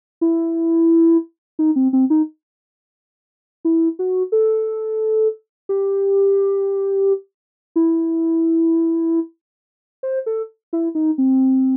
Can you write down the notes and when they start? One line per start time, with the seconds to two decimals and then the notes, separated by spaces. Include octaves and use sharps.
0.21 E4
1.59 D#4
1.76 C4
1.93 C4
2.10 D#4
3.65 E4
3.99 F#4
4.32 A4
5.69 G4
7.76 E4
10.03 C5
10.26 A4
10.73 E4
10.95 D#4
11.18 C4